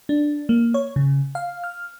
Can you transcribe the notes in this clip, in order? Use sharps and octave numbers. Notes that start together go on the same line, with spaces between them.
D4
A#3
C#5
C#3
F5
F6